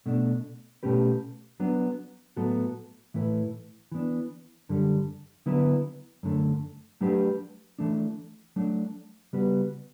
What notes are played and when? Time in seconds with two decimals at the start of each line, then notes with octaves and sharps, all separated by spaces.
0.06 B2 A3 D4
0.83 B2 A3 C#4 G4 B4
1.60 F#3 B3 D4
2.37 A2 F#3 B3 F#4 A4
3.14 A2 E3 A3 E4 B4
3.92 E3 B3 D4
4.69 F#2 D3 G3
5.46 D3 F#3 B3 E4 B4
6.23 F#2 D3 A3
7.01 F#3 A3 D4 G4 B4
7.79 E3 A3 D4
8.56 F#3 A3 D4
9.33 C#3 G3 B3 F#4 B4